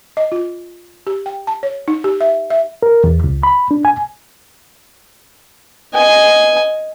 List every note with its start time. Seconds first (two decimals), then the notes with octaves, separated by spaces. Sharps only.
0.17 D#5
0.32 F4
1.07 G4
1.26 G5
1.47 A5
1.63 C#5
1.88 D#4
2.04 G4
2.21 E5
2.50 E5
2.83 A#4
3.04 E2
3.24 C#2
3.43 B5
3.71 D4
3.85 G#5
5.94 D#5 G#5